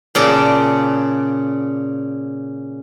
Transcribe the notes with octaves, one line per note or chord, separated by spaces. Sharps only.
A#2 C#3 D5 A5